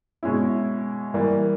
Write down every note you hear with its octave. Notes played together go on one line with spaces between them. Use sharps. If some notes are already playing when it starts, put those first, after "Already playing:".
B2 G#3 C#4 E4
E3 G3 A#3